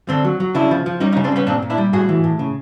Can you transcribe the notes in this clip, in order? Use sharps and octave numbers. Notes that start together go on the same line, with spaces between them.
D3 C4 D4
F#3
F#3
C#3 D4 E4
F3
F3
G3 C#4 D#4
C#4 D#4
C#3
C4 D4
G3 B3 C#4
A#2 C4 D4
A#2
D4 E4
G3
A2 F#4 G#4
E3
A2
C#3